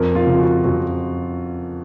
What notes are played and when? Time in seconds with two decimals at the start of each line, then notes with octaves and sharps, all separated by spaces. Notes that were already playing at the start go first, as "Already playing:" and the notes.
Already playing: F2 A#4
0.15 F4
0.27 C#3 F3
0.39 F#4
0.63 F2 F#4